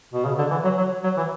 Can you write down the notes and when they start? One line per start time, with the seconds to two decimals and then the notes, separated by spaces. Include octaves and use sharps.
0.14 B2
0.25 C#3
0.38 D3
0.50 E3
0.64 F#3
0.77 F#3
1.04 F#3
1.17 E3